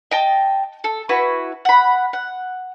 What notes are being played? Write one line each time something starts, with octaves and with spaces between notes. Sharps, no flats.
D#5 G5 A5
A4
E4 F#4 B4
F#5 B5
F#5